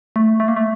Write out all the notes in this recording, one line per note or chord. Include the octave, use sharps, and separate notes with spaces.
A3
A3
A#3
A3